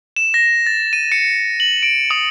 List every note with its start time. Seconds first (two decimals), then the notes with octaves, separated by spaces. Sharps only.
0.16 E7
0.34 A#6
0.66 A6
0.93 D#7
1.12 C#7
1.60 F#7
1.83 D7
2.11 D#6